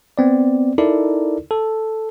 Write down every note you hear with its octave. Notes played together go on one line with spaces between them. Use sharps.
B3 C4 D5
D#4 E4 A4 A#4 D5
A4